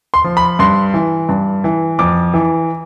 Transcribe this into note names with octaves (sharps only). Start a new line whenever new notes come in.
C6
F3
B5
G2 C6
E3
G2
E3
F2 D6
E3